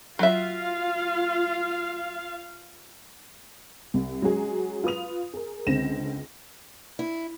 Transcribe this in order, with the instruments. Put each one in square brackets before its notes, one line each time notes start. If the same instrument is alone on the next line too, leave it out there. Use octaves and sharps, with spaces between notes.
[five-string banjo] F#3 E5 [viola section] F4 F5
[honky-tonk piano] C2
F#3 G#3 C#4 F#4 G#4
F4 B4 D#6 F7
G#4 A#4
C#2 D3 C4 A#6 E7
[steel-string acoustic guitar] E4